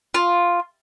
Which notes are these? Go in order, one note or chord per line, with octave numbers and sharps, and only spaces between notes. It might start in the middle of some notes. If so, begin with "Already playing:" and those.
F4